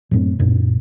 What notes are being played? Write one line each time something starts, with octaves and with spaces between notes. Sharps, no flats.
F#2 A2 C4
C2 F#2 A#2